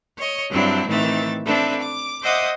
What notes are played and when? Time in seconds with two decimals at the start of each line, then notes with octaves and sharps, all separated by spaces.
0.17 C#5 D#5
0.50 G2 F#3 C4 D4 E4
0.88 A2 D#3 E3 C4 E5 A6
1.46 C4 D4 A4 B4 E5
1.80 D6
2.22 C5 D#5 E5 F#5 D6 D#6